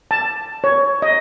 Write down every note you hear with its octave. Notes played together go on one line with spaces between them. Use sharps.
A5
C#5
D#5